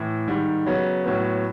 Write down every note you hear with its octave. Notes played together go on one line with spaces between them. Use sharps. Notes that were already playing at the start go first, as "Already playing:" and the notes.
Already playing: A2 E3
G#2 D#3 G3
C#3 F#3 B3
A2 F#3 B3